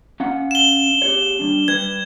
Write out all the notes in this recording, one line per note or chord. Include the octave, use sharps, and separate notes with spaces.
C#4 F5 F#5
E7 G7
G4 G#4 C#5
G3 G#3 D4
G3 B4 G#6